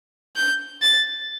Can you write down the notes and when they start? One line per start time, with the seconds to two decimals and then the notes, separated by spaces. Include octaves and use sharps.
0.36 G6
0.82 A6